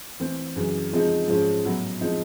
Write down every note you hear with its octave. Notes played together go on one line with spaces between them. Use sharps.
E3 A3 C4
F#2 C#3 E3
C#3 F3 G#3 C4 D#4
G#2 F3 G#3 C#4
A2 F#3 B3 E4 A4
F3 G#3 C4 D#4